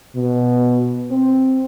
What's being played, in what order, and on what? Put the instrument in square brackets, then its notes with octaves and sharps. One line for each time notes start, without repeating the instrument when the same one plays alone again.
[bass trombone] B2
C4